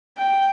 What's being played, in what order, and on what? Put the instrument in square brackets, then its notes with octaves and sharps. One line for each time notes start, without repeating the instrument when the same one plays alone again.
[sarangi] G5